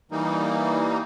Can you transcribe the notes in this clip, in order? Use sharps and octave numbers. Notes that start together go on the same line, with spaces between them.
E3 G3 A#3 D#4